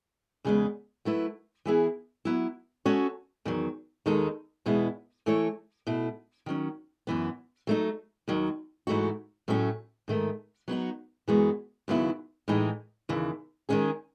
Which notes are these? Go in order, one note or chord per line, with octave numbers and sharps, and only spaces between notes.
E2 C#3 G#3 B3
F#3 A3 E4 B4
E3 B3 E4 G#4
F#3 B3 E4
G#3 C#4 F#4 A4 C#5
E2 D#3 F#3
D#2 D#3 G#3 D#4 A4
E2 B2 G#3 B3 E4
E3 A3 E4 A4 C#5
B2 A3 E4
D#3 F#3 C#4
F#2 E3 B3
F#3 A3 D#4
D#2 D#3 F#3
G#2 E3 A3 D#4 F#4
A2 F#3 A3 C#4
G#2 D#3 A3
F#3 B3 D#4 F#4
F#2 E3 G#3 B3 F#4
D#2 C#3 F#3 B3 E4
A2 E3 G#3 D#4
D#2 C#3 E3
D#3 G#3 C#4 G#4